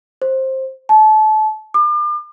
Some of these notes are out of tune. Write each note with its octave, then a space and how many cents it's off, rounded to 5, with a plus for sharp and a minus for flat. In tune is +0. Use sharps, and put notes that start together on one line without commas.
C5 +15
A5 -30
D6 +40